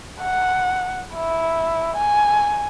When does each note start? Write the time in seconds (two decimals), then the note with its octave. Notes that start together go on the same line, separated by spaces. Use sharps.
0.22 F#5
1.15 E4
1.97 G#5